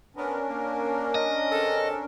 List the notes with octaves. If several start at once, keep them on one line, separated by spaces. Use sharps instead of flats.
B3 C#4 D4 A#4
A#3
D#5
C#3 C4 A4